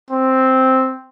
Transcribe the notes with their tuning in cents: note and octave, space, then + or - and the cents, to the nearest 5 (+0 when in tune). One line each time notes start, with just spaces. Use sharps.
C4 +0